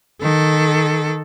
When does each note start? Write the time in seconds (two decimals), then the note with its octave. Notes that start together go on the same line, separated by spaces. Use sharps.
0.22 D#3 A4